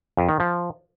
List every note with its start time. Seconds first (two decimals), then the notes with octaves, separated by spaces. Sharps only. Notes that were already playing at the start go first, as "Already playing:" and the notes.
0.17 F2
0.29 D#3
0.40 F3